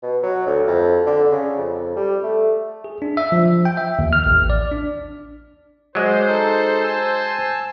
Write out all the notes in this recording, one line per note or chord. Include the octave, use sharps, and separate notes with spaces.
B2
F#3
D2
F2
D3
C#3
F2
G3
A3
G#4
D4
E5
F3
G5
E5
D#2
F6
A1
D5
D4
F#3 G#3 C5 D5
D#4 A4 A5
G#5 A5 E6